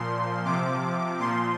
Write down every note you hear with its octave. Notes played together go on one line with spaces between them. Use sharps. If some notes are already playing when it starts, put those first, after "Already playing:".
Already playing: A#2 F3 C6
C3 F3 D6
A#2 C6
F3